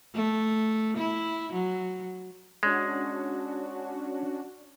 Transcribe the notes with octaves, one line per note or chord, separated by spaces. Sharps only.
A3
E4
F#3
G#3 C#4 D4 F#4